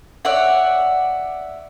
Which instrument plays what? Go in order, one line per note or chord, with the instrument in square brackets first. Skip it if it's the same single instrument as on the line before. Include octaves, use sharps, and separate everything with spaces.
[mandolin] C#5 D5 E5 F#5